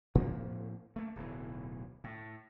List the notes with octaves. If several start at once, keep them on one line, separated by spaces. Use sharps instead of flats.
A2 F3 A#3 C4
A3 A#3
D1 B1 E3
A2